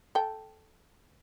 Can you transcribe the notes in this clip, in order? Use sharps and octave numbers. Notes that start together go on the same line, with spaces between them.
A4 G5